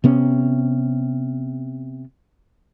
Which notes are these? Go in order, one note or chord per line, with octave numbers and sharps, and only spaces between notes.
C3 B3 C#4